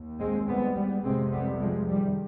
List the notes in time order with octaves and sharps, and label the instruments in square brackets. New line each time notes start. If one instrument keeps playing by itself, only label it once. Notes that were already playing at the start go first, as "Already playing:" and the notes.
Already playing: [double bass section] D#2
G#3 C4
G3 B3
G3 B3
F2 C3 G#3 C4
G3 B3
F3 G#3
D#3 G3